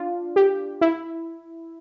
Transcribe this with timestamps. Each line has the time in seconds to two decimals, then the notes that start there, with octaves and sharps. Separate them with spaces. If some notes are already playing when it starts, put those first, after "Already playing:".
Already playing: D4 F4
0.36 G4
0.81 E4